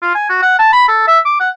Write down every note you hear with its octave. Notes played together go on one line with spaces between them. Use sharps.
F4
G#5
F#4
F#5
A5
B5
A4
E5
D6
F#5